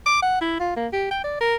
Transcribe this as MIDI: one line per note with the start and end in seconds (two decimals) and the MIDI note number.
0.06 0.21 86
0.22 0.39 78
0.41 0.58 64
0.60 0.73 65
0.77 0.88 58
0.93 1.07 67
1.11 1.19 79
1.24 1.40 74
1.41 1.55 70